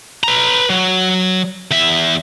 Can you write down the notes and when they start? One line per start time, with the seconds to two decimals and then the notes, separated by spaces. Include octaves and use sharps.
0.24 B4 A#5
0.70 F#3
1.71 E2 E5